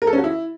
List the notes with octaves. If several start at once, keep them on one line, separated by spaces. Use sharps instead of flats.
A#4
A4
C#4
F#4
E4